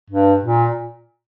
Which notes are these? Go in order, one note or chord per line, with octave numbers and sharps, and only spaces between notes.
G2
A#2